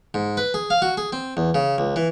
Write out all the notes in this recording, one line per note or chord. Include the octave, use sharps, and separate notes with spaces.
G#2
B4
G#4
F5
F#4
G#4
C4
E2
C#3
C#2
E3